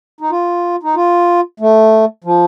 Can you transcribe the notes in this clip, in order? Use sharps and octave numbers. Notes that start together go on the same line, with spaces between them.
D#4
F4
D#4
F4
A3
F3